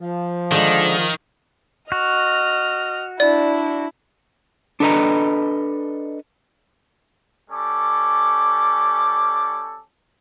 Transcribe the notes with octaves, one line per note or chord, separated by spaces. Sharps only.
F3
D3 D#3 G#3
F#4 D#5 F6
D4 E4 D5
D4 A4 B4 D#5 A#5
G3 C#4 A4 D6